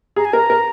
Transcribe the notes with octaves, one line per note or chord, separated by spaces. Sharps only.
G#4 A#5
G#5
A#4 A#5
A#4